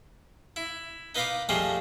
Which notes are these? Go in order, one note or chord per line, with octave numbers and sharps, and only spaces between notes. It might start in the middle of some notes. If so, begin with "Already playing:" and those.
E4
D#4 B4 D#5 F5 B5 D6
F3 G3 A3 F4 G#4 D#5